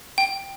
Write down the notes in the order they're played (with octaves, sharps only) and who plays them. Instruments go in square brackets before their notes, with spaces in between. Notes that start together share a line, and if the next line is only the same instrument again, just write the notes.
[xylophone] G5